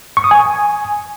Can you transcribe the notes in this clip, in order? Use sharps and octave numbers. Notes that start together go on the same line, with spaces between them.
C#6
D#6
G#5